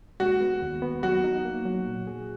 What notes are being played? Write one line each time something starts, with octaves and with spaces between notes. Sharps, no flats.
G#3 F#4
B3
D#2
B3
F#3 F#4
D#4
A#3
F#3
A#2
G#4